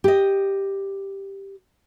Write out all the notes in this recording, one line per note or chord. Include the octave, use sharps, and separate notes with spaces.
G4 D#5